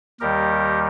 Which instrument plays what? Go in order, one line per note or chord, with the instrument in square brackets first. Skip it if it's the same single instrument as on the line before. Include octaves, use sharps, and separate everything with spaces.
[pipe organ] D#2 D#3 G3 G4 A#4